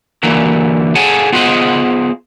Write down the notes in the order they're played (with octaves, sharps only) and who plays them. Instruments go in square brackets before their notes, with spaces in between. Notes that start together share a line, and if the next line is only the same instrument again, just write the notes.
[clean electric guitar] D3 E3 F#3 A#3
G#4 A4 C#5 F#5 G#5 A5
B3 F4 G#4 C5 D#5 F#5